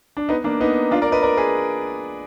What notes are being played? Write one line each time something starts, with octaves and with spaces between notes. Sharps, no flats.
D4
B3 D#4
A#3 D4
B3 D#4
D4 F4
A#4 D5
B4 D#5
A#4 D5
G#4 B4